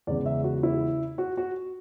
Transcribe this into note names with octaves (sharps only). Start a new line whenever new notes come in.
E2 C#3 G#3 D5
E5
F#4
E4
F#4
F#4